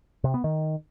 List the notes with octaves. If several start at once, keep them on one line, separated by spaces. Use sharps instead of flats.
C3
B3
D#3